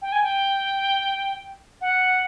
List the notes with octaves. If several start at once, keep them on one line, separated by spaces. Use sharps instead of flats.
G5
G#5
G5
F#5